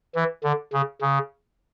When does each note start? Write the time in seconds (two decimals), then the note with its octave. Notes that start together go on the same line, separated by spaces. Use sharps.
0.15 E3
0.44 D3
0.73 C#3
1.01 C#3